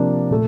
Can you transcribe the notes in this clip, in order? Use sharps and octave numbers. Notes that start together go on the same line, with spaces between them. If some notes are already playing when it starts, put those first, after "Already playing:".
Already playing: C3 F3 A#3 D4
A#2 A3